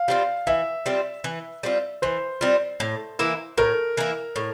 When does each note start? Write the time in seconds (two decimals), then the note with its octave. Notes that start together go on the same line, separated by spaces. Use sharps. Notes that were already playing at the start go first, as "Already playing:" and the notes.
Already playing: F5
0.08 G3 C4 F4
0.47 E3 E5
0.86 G3 C4 F4
1.24 E3
1.63 G3 C4 F4
2.02 E3 C5
2.41 G3 C4 F4
2.80 A2
3.19 E3 A#3 E4
3.58 A2 A#4
3.97 E3 A#3 E4
4.36 A2